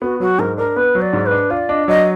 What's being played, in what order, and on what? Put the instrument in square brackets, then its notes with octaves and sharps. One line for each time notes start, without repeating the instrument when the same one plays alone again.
[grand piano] B3 [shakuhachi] F#4
[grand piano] F#3 [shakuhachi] F#4
[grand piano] G#2 [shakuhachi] A#4
[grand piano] D4 [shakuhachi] A#4
[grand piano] B3 [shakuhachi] B4
[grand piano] F#3
[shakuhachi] D5
[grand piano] G#2
[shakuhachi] B4
[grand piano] D4
[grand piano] F4 [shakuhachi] D5
[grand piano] D4 [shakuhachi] D#5
[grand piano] F#3 [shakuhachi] D#5